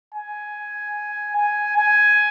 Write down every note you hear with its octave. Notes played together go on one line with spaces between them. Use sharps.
G#5
G#5
G#5